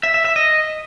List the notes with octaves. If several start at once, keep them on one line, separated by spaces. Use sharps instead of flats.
E5
E5
E5
D#5